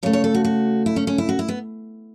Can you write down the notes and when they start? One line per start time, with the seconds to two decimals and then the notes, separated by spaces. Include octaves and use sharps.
0.03 C#3 C#5
0.06 A3
0.13 C#5
0.24 A4
0.35 F#4
0.45 F#4
0.86 E4
0.96 C#4
1.07 C#4
1.18 E4
1.29 F#4
1.39 E4
1.48 B3